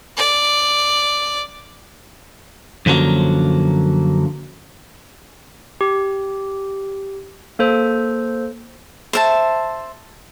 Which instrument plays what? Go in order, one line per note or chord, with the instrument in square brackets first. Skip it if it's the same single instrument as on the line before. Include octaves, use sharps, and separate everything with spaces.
[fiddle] D5
[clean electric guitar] F#2 D3 F3 F#3 A#3
[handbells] G4
A#3 A4 C5
[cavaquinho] C5 E5 A5